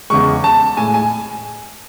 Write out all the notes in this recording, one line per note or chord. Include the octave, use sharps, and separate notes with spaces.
E2 C#3 G#3 C#6
A5
A2 G#3 G#5
G#5